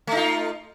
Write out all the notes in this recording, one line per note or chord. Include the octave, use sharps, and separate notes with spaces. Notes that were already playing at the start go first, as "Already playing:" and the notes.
A3 D#4 F4